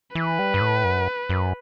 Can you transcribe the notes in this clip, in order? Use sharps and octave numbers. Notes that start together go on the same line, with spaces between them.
E3 B4
G3
G2
A2
F#2
F#2